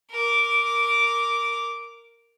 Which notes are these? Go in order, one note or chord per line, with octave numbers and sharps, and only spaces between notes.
A#4 D6